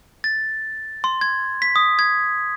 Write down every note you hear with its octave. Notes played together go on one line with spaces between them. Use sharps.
A6
C6
G#6
B6
D#6
G#6